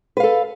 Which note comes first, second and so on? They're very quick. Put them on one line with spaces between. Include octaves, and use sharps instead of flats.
B4 F5 A4